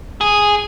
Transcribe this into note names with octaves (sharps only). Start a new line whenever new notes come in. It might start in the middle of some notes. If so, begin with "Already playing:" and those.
G#4